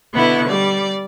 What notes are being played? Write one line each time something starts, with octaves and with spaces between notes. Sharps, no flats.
B2 D3 B3 E4 C#6
G3 D5